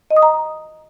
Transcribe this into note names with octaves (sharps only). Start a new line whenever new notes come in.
D#5
D#6
A#5